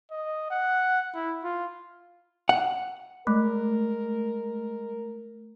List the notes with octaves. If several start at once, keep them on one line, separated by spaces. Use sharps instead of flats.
D#5
F#5
E4
F4
F#5
G#3 A3 A#4